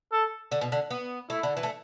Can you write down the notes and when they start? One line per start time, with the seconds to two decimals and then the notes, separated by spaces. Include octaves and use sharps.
0.12 A4
0.51 D3
0.61 B2
0.72 D3
0.90 B3
1.30 A3 E4
1.43 D3
1.57 E3
1.63 A3